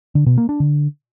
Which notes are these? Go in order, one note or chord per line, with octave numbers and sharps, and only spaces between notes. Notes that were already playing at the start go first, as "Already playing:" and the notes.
D3
B2
A#3
D4
D3